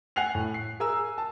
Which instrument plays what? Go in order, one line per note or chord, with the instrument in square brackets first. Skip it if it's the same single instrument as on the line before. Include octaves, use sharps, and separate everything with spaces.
[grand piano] F#5 G#5 F#6 C7 F7
A2
C7
G#4 A#4 G#5 A#5 E6
A5